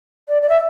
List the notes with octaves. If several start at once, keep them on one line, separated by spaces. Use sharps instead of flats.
D5
D5
E5